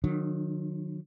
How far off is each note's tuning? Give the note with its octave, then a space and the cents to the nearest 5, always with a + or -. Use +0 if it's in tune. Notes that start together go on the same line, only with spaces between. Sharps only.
D#3 -35 F#3 -35 D4 +20